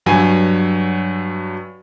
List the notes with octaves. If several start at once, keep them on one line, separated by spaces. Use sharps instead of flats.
G2 F#3 G#5